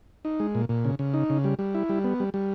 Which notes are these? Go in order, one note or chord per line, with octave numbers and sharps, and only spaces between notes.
D#4
G#3
A#2
A#2
C#3
C#3
D#4
C#3
G3
G3
E4
G3
B3
G3
G3